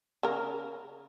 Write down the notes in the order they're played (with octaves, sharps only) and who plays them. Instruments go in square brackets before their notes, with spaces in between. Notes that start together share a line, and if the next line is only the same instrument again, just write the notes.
[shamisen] C#3 A#4